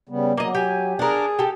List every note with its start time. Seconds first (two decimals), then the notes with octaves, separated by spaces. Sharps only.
0.09 C#3 G3 B3
0.37 F#3 A#3 D#5
0.55 G4 G#5
0.99 D4 G#4 A#4
1.39 G4 A4